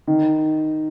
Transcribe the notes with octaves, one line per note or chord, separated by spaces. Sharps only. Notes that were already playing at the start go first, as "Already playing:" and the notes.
D#3